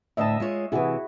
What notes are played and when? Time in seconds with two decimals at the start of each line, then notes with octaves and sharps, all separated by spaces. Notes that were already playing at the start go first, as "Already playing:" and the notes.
0.17 D2 A2 D#5 E5 A5
0.40 G#3 F4 C#5
0.72 C3 E3 E4 F#4 G#4